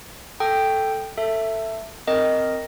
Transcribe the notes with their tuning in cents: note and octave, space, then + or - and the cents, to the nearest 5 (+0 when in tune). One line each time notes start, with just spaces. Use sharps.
A4 +0 G5 +0 D#6 -25
A4 +20 E5 +5
C4 +0 A#4 -5 D#5 +0